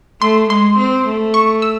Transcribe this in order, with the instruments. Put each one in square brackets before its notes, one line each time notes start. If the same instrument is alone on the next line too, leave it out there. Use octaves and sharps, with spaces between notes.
[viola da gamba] A3 [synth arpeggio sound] C6
[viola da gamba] G#3 [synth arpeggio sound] C6
[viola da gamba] C4
A3
[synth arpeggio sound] C#6
E6